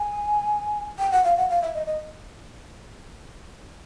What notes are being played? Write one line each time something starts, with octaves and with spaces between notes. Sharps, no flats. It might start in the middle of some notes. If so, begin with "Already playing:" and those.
Already playing: G#5
G5
F#5
F5
F#5
F5
E5
D#5
D#5